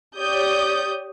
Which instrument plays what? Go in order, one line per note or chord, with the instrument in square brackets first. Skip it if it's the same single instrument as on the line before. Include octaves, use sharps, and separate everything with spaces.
[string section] G4 C#5 D5 D#6 G6